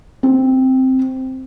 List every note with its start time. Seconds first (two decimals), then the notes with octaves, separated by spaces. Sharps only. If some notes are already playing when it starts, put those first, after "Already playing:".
0.23 C4